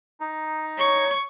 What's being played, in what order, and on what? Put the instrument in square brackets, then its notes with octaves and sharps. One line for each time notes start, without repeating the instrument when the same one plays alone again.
[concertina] D#4
[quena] C#5 [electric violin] C#6